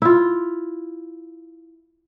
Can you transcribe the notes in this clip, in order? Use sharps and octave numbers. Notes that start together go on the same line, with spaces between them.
E4 F4